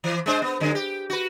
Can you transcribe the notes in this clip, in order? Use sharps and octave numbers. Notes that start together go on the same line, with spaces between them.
E3
G#3 D4 C5
B3
F#2 D3 G#3
G4
F#4 B4